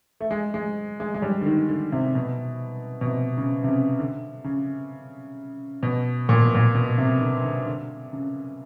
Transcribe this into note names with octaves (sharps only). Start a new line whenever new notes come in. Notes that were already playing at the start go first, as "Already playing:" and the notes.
A3
G#3
G#3
G#3
G#3
G3
D3
D#3
D3
C3
B2
B2
C3
C#3
C3
C#3
D3
C#3
B2
A#2
B2
A#2
B2
C3
D3
D3
D3
C#3